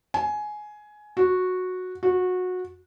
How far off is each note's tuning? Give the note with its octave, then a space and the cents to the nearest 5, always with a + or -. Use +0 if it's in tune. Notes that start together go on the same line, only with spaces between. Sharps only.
G#5 +15
F#4 -10
F#4 -20